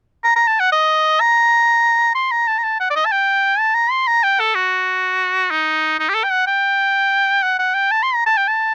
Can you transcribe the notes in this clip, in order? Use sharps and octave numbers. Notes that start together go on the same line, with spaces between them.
A#5
A#5
A5
F#5
D#5
A#5
C6
A#5
A5
A#5
A5
F#5
D5
D#5
A5
G5
A5
A#5
C6
A#5
G5
A4
F#4
D#4
D#4
G4
A4
G5
F#5
G5
F#5
F#5
G5
A5
C6
A#5
A5
G5
A5